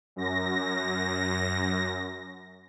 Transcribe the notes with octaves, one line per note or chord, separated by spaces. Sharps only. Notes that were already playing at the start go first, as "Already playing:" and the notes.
F#2 A#6